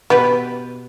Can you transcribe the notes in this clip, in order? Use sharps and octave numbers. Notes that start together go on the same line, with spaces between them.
B2 B3 G4 B4